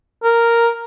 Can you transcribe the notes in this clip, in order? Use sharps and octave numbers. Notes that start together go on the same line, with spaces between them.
A#4